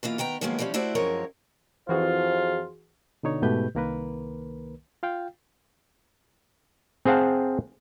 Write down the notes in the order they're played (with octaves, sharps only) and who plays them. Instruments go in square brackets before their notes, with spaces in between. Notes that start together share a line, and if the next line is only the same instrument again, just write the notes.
[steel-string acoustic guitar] B2 E3 A#3 F4
D#3 B3 G5 A#5
D#3 F3 F#3 G#3 A#3 B3
E3 F3 G3 C4 C#4
A3 E4 F#4 C5 D5 E5
F#2 F3 G#3 C4 A#4 C#5
[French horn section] F2 C5 [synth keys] E3 F#4 G#4 [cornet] F4
[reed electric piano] B2 D3 D#4 C#5
G#2 B2 A3 G4 B4 G6
C2 D#3 A#3 A#4 B4
F4 F5 G5
[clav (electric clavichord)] C4 G#4 C5 F5 F#5 A5